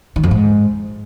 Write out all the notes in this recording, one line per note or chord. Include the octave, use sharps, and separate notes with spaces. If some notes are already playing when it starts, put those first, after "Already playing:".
D#3
F2
G#2